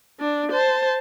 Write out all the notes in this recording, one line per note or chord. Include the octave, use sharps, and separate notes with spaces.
D4
C5 A5